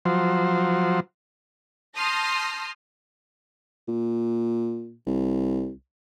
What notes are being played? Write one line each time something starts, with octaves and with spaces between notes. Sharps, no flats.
F3 F#3 C5
A5 C6 D#6 F6 G6 A#6
A#2
C2